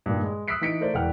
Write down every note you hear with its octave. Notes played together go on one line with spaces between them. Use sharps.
G2 A#2 D#3
G#3
D#6 E6 F#6 B6 C7 D7
E3 D#4 B6 C#7 D7
A3 A#4 C5 D5
E1 E3 F#5 G5 F6